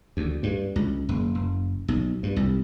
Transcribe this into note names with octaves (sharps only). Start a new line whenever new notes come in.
D2
G2
C#2
F#1
F#1
B1
G2
C2